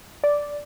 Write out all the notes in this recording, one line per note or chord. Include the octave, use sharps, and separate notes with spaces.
D5